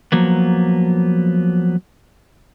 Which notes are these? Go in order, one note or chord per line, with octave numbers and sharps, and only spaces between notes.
F3 F#3 A#3 B3